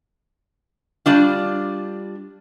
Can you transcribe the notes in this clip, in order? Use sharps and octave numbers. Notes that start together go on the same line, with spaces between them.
G3 D4 F4